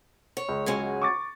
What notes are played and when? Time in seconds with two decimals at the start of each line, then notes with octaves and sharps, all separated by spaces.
0.37 C#5
0.49 C#2
0.66 F#3 G#3 C#4
1.02 C#6 D6 A6